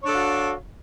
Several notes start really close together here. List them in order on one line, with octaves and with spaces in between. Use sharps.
C#5 D4 A4 F5 F#4